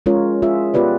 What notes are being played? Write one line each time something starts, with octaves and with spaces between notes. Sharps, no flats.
G#3 C#4 F4 A#4 C#5
F4 G#4 E5
B3 F4 G4 B4 D5